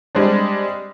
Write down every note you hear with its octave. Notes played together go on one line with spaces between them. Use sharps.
G3 G#3 C4 D4